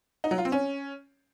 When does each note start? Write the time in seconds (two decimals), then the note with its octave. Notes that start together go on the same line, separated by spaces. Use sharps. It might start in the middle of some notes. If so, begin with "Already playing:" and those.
0.24 D#4
0.31 F#3
0.38 F4
0.45 C4
0.52 C#4